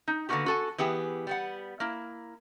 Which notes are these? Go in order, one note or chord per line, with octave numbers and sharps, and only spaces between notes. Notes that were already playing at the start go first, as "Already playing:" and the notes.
D#4
D3 A#3 B3 C#4 F#4 G4
F#4 A4 G#5
E3 B3 G4 G#4
G3 B3 F#5
A#3 E4